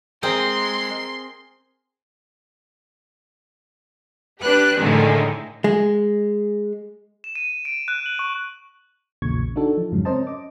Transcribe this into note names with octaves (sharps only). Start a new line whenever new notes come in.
G#3 C4 G#4 A#4 D#5 C6
D4 G4 B4 F#6
A2 D3 D#3 G#3
G#3
E7
D#7
D7
F#6
F#7
C#6
A#1 E2 A#2 C#3 C#6 G#6
D4 D#4 F#4 A4
F3
F2 G#2 C#3 F#3 G#3
C4 C#4 A#4 C5 D#5 A5
D#5 D6